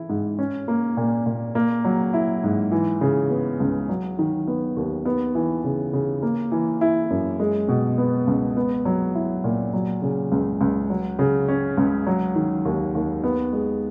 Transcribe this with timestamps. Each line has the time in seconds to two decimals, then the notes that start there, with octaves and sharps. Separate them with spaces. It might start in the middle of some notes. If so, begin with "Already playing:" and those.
Already playing: E3 E4
0.09 G#2
0.39 C#4
0.68 A#3
0.97 A#2
1.26 A#2
1.55 A#3
1.85 F#3
2.14 E4
2.43 G#2
2.72 E3
3.01 C#3
3.30 B3
3.60 C#2
3.89 F#3
4.19 D#3
4.48 B3
4.77 D#2
5.05 B3
5.35 E3
5.64 C#3
5.93 C#3
6.22 A#3
6.52 E3
6.81 E4
7.10 F#2
7.39 G#3
7.68 B2
7.98 B3
8.27 C#2
8.57 B3
8.85 F#3
9.15 E4
9.44 A#2
9.73 F#3
10.02 C#3
10.32 C#2
10.61 C#2
10.90 F#3
11.19 C#3
11.48 C#4
11.78 C#2
12.07 F#3
12.35 D#3
12.65 D#2
12.95 D#2
13.24 B3
13.53 G#3